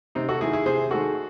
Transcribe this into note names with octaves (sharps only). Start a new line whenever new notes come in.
C3 C4 D#4
F#4 A4
D#3 G#3 E4 G#4
E4 G#4
C3 G#4 C5
D#3 G#3 F#4 A4